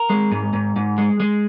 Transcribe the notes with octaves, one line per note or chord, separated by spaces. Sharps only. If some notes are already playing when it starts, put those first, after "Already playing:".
Already playing: A#4
G#3
G#2
G#2
G#2
G#3
G#3